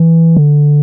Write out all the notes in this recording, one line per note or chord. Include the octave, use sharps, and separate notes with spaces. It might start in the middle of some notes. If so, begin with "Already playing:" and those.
Already playing: E3
D3